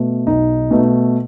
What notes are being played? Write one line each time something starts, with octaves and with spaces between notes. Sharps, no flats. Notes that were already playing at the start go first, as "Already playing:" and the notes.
Already playing: B2 A3
B1 D#4
B2 A3